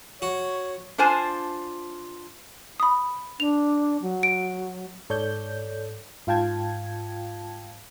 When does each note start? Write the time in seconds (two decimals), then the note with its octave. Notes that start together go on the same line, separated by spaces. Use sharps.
0.22 F#4 C#5
0.98 D4 F4 C5 G#5 A5
2.80 B5 D#6
3.40 D4 F7
4.02 F#3
4.23 D7
5.10 G#2 A4 C#5 D5 G6
6.27 G#2 F4 F5 G5 A5 G#6